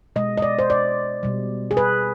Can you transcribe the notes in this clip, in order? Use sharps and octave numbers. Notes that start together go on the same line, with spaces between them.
B2 G#3 D#5
D#5
D5
C5
D5
B2 G3
G#4
B4